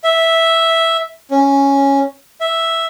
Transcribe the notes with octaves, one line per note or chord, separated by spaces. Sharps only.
E5
C#4
E5